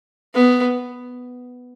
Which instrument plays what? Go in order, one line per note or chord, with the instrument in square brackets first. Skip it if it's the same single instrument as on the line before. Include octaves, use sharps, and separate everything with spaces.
[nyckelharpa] B3